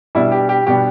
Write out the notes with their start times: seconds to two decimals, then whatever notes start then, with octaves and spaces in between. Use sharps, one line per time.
0.15 B2 G3 B3 D4 E4
0.32 G4
0.49 G4
0.67 B2 G3 B3 D4 G4